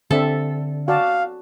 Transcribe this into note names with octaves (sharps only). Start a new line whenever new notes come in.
D3 C4 D4 A4 E5
F#4 D5 F5 A5